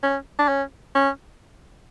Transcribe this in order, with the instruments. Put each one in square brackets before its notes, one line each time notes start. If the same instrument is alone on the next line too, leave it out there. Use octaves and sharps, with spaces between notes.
[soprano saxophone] C#4
D4
C#4
C#4